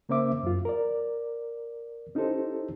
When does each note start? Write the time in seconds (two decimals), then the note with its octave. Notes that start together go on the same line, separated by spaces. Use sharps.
0.09 C#3 A#3 C#4 C5 E5 D6
0.43 F#2 F4
0.65 A#4 D5
2.15 C#4 D#4 E4 G4 A4 C5